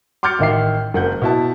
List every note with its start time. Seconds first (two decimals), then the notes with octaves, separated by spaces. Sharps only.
0.23 C6 D6 F6 G6 A6 C#7
0.39 A1 D#3 E5 C7
0.94 F#1 F#5 G6
1.22 B2 E4 A5